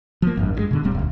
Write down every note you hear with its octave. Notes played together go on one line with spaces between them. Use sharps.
F3 A#3
G#1 E2 G2
G2 D3 G#3
B2 D3
D1 A#2 G3 C4
E1 D2